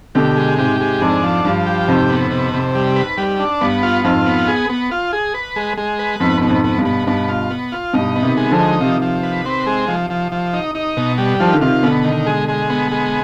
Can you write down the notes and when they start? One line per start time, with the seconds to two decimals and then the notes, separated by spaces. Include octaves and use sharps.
0.15 B2 D3 G4
0.37 G#3
0.58 G#2 C3 G4
0.80 G#3
1.01 F2 G#2 D4
1.23 F3
1.44 G2 F3
1.66 G4
1.88 F2 G#2 C3
2.10 B3
2.31 C3
2.53 C3
2.75 G3
2.96 B4
3.18 G3
3.39 D4
3.61 G2 B3
3.83 F4
4.04 F2 G#2 F4
4.26 B3
4.47 G#4
4.69 B3
4.91 F4
5.13 G#4
5.34 B4
5.56 G#3
5.77 G#3
5.99 B4
6.20 F2 G#2 B3
6.41 B2 B3
6.49 F2 G#2
6.64 B3
6.78 G2 B2
6.85 B3
7.07 G2 B2 B3
7.29 F4
7.50 B3
7.72 F4
7.93 G2 B2 D#4
8.16 B3
8.22 C3 D#3
8.37 G#3
8.51 D3 F3
8.59 D#4
8.80 C3 D#3 F3
9.02 F3
9.23 B4
9.45 C4
9.67 G#3
9.88 F3
10.10 F3
10.32 F3
10.53 D#4
10.75 D#4
10.97 B2
11.18 G3
11.40 F3 F4
11.47 D#3
11.54 D3
11.61 C3 D#3 F4
11.83 B2 D3 B3
12.04 D#3
12.26 G#3
12.48 G#3
12.70 B3
12.91 G#3